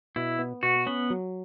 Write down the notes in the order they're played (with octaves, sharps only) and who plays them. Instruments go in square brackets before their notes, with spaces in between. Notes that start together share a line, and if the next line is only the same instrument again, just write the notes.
[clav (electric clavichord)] B2 [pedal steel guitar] E4
[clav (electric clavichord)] B3
[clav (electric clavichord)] B2 [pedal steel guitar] F#4
[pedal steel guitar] B3 [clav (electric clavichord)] C#4
[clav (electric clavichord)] F#3